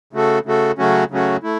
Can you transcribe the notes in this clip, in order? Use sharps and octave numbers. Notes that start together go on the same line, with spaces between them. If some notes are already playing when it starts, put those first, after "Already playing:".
C#3 A3 F#4 A4
C#3 A3 F#4 A4
C#3 F#3 A3 C#4 F#4
C#3 F#3 A3 C#4 F#4
A3 E4